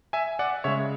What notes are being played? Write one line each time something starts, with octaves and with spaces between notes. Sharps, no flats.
E5 G#5
D5 F#5
C#3 G#3 C#5 E5